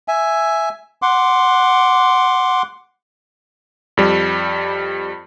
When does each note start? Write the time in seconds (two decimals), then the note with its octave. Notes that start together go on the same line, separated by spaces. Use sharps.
0.08 E5 G#5
1.02 F#5 C6 D6
3.97 F2 G3